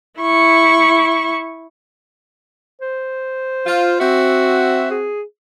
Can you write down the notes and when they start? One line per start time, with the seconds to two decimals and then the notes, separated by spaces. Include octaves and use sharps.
0.20 E4 C#6
2.81 C5
3.66 F4
4.00 C4 F#4 E5
4.90 G#4